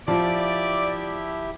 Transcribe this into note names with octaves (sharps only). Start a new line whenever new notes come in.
F3 E4 G4 D5 E5